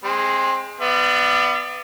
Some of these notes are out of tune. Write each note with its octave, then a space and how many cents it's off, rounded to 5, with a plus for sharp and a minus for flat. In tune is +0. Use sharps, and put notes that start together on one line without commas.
G#3 +0 C4 +20
B3 +20 D5 +25 F5 -40